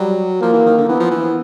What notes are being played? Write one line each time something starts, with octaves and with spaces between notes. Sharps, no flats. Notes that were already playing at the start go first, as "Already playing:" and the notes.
Already playing: F#3 G3
F3 A#3
E3
D#3
D3
E3 B3
F3
E3